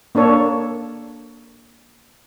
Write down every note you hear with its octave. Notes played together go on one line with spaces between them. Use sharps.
A#3 D4 A4 C#5